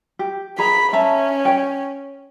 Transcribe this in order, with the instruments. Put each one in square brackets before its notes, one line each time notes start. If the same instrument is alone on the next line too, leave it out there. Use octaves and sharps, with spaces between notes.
[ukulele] G4
[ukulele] G#4 A#5 [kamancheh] B5
[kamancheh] C#4 [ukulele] E5 A5 A#5
[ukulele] C#5 G5